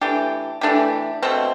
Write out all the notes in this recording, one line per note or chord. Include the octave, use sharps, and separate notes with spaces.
E3 A3 D4 G4
E3 A3 D4 G4
B2 A3 C4